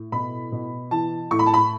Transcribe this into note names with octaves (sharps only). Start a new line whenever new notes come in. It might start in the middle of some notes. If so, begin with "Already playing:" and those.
Already playing: A2
B2 B5
B2
E3 A5
A2 C#6
B5
A5
B5